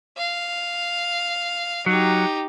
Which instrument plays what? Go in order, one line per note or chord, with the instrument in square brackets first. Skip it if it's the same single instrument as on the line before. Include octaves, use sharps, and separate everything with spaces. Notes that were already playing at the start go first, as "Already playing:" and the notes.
[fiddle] F5
[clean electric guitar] F#3 [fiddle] D#4 G4